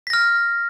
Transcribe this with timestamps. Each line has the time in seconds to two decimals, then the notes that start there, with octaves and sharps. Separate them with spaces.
0.07 B6
0.10 A#6
0.13 F6